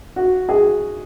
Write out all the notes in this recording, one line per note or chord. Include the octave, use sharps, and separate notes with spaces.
F#4
G#4